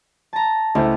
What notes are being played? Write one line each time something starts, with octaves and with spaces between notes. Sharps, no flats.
A5 A#5
C#2 A3 E4 C5